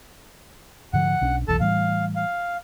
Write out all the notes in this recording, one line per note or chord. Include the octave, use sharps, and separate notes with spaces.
G#2 D3 F3 F#5
B1 C#4 D4
F1 B1 E3 A4 A5
A2 E3 G3 F5
F5